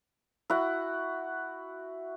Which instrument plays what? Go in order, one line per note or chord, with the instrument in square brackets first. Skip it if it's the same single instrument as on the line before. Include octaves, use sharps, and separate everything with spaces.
[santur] E4 F#4 F#5